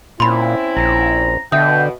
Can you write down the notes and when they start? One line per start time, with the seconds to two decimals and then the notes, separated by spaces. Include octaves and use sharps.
0.20 A#2 C4 C#4 E4 B5 C6
0.77 A#1 A#5
1.52 B2 D3 E5 G5 D#6